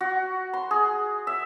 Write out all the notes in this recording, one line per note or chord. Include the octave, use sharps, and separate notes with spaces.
F#4
C6
G#4
E5